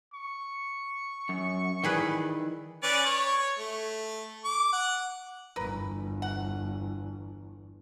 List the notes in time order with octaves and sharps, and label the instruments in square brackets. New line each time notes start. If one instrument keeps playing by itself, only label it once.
[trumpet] C#6
[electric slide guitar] F#2
[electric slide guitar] D#3 E3 [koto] G3 G#4 B4
[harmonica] C#4 B4 D5
C#5
A3
D6
F#5
[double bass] G1 E2 [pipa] A#4 B4
[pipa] F#5